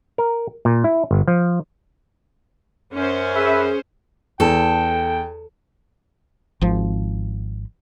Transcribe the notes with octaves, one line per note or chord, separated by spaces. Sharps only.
A#4
A#2
E4
G1
F3
F#2 C#4 C5
G#4 B4 E5
E2 A4 G5
G#1 F3